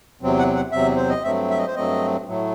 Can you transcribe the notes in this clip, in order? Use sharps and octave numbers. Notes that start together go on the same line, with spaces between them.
E2 C3 F#3 C4
F#5
F#5
E2 C3 F#3 C4 E5
C5
D#5
G2 F#3 A3 C4 E5
E5
D#5
C5
G2 F#3 A3 C4 D#5
A2 F#3 A3